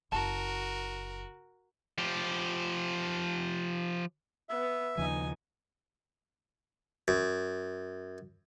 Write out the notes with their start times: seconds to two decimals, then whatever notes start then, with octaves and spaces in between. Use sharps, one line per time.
0.12 F#1 F#4 A#4 A5
1.98 F3 G4
4.49 B3 E5
4.97 D#2 C#3 F3 D#4 G#5
7.08 F#2